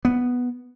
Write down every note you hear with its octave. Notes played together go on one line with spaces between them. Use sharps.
B3